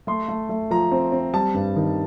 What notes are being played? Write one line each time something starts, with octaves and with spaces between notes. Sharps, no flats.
A3 C6
A3
A3
F3 A#5
C4
C4
G3 A5
G2
D#3